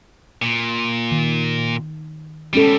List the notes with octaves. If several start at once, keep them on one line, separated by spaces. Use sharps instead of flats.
A#2
D#3
B2 G3 G#3 C#4 A4